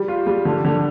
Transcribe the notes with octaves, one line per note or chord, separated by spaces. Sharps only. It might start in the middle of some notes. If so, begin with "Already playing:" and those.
Already playing: G3 G4
F4
G3
D3
D3